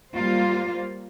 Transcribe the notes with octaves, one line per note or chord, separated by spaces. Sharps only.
G3 A#3 F4 C5